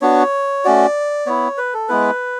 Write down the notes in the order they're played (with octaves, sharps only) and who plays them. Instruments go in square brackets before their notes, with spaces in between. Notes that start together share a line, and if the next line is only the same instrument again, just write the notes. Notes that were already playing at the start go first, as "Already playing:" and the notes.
[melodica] B3 D4 F#4 C#5
A3 C#4 F#4 D5
B3 E4 C#5
B4
A4
G#3 B3 E4 B4